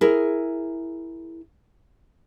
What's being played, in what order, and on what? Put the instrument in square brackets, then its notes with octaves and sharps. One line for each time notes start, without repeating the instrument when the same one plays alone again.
[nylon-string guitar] E4 G#4 A#4